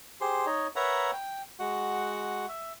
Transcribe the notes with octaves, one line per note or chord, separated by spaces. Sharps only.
G4 G#4 C5 C6
D#4 C#5 D#5
A#4 B4 C#5 E5 F#5 A#5
G5
G#3 F#4 F#5
E5